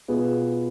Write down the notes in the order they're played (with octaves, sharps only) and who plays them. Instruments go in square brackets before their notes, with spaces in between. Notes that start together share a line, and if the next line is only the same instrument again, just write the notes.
[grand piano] B2 B3 F4 G#4 B4